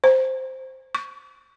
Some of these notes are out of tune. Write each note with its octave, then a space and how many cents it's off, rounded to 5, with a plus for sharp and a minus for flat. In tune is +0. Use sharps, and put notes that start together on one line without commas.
C5 +0
C#6 +25